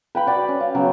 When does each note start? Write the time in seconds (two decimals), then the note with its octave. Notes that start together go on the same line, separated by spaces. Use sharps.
0.15 B4 G5 B5
0.27 F#4 D5 G5
0.48 C#4
0.60 F5
0.75 C#3 F#3 B3 G5